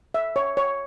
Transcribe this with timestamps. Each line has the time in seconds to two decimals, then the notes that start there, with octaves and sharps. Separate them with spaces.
0.14 E5
0.36 C#5
0.57 C#5